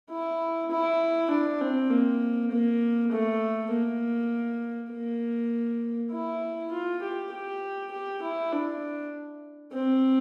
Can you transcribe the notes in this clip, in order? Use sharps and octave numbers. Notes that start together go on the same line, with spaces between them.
E4
E4
D4
C4
A#3
A#3
A3
A#3
A#3
E4
F4
G4
G4
G4
E4
D4
C4